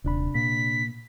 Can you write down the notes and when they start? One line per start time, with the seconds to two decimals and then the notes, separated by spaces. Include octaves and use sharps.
0.04 D#1 C3 D4 B5
0.35 A#2 B6